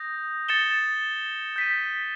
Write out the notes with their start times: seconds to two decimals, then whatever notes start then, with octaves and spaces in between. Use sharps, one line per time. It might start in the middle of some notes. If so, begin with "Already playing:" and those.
Already playing: D#6 G6 A#6
0.49 A6 C#7 E7 G7
1.56 G6 B6 D#7